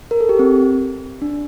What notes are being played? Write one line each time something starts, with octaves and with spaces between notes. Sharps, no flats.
A#4
A4
G4
C4
D4